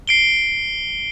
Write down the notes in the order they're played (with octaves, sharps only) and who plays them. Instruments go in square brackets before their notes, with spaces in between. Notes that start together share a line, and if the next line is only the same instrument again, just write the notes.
[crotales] C7 D7 G7